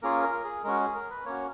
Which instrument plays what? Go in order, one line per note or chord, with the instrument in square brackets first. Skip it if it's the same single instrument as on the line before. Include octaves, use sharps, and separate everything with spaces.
[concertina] A#3 C#4 F4 G#4 A#4
A#4
G#4
G#3 C#4 F#4 A#4
G#4
A#4
B4
A#3 C#4 F#4 C#5